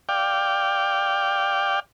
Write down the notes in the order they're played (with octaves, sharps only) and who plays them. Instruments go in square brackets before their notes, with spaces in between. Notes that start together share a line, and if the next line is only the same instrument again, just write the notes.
[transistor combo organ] D5 F5 G5